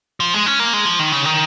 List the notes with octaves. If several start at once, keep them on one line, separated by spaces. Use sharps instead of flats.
F3
G#3
C#4
A#3
G#3
F3
D#3
C#3
D#3